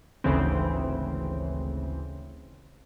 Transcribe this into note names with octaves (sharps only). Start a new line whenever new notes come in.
G#1 D2 C#3 E3 C4